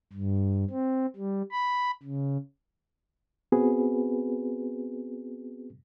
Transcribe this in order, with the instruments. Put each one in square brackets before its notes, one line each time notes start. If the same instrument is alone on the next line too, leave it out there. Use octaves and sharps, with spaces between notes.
[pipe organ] G2
C4
G3
B5
C#3
[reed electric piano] B3 C4 F#4 G#4 B4